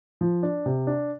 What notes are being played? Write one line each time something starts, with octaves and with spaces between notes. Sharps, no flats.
F3
D4
C3
D4